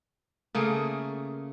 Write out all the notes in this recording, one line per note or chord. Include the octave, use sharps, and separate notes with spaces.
C#3 A3 A#3 G#4